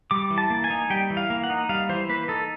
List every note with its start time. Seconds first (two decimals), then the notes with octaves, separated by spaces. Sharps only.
0.11 G3 D6
0.30 E3
0.38 A5
0.50 A#3
0.64 G#5
0.70 D#4
0.90 G3 G5
1.10 E3
1.17 F5
1.30 A#3
1.44 F#5
1.50 D#4
1.69 G3 F5
1.89 E3 C5
2.09 A#3 B4
2.28 D#4 A4